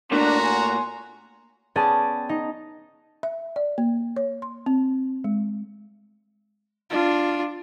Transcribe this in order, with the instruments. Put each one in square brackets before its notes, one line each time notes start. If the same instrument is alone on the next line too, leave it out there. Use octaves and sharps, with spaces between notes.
[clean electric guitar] A#2 A3 A#3 [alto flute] D4 [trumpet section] F#4 A#5 [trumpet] C6
[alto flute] G#5
[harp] B3 C#4 G#4 D5 G5 A5
D#4
[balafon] E5
D5
A#3
C#5
C6
C4
G#3
[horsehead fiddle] D4 F4